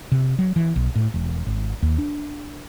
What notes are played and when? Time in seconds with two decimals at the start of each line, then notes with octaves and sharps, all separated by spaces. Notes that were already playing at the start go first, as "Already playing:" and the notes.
0.12 C3
0.39 F#3
0.56 E3
0.76 B1
0.96 A2
1.14 E1
1.47 G#1
1.82 D#2
1.98 D4